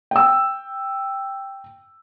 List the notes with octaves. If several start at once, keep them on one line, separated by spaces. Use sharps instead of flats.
G5 E6